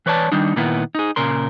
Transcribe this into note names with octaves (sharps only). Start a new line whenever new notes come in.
E3 B4 C#5 D5 A5
D#3 G3 D4 D#4
A#2 D#3 A#3 B3 E4
D#4 G#4
A#2 C#3 A#4 C6